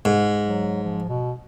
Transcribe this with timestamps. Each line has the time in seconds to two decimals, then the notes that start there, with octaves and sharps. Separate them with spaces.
0.05 G#2
0.45 F#3
0.84 F3
1.09 B2